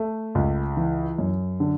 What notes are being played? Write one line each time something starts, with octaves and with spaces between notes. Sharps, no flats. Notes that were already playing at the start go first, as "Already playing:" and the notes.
Already playing: A3
C#2
E3
F#2
D3